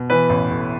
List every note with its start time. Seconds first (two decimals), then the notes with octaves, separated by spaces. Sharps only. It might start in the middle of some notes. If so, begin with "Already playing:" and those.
Already playing: B2
0.10 E3 B4
0.29 A1
0.50 A2